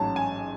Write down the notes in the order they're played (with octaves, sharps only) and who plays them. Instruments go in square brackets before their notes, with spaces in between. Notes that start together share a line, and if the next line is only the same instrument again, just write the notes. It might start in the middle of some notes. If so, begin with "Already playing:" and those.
Already playing: [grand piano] A1 G#2 F#3 C#4 A5
G#5